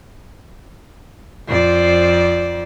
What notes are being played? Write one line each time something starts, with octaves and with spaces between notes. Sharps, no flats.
F2 C5 D5